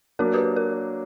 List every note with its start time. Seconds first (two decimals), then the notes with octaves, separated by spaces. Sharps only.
0.19 F#3 A#3 D4 F#4 A#4
0.34 G4 B4
0.56 A#4